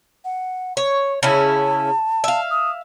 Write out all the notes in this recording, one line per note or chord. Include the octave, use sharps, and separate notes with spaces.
F#5
C#5 C#6
C#3 C#4 E4 A5
E5 F5
D#6